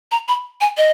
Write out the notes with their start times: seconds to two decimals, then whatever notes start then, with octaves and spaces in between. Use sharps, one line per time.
0.11 A#5
0.28 B5
0.61 G#5
0.77 D#5